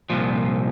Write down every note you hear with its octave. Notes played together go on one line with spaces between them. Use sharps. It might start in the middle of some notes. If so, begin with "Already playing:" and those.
C2 A#2 F3